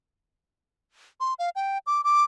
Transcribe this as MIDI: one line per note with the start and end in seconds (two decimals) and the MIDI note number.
1.20 1.34 84
1.39 1.50 77
1.56 1.78 79
1.87 2.04 86
2.04 2.24 86